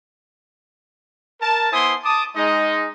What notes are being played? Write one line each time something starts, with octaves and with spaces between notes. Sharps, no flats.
A#4 A5
B3 E4 C5 G#5 C6 D#6
A5 D6 D#6
G#3 D#4 D#5